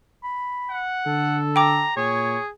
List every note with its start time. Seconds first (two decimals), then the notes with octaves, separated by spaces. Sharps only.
0.24 B5
0.70 F#5
1.06 D3 A4
1.56 G5 A#5 D6
1.97 A#2 G#4 C#5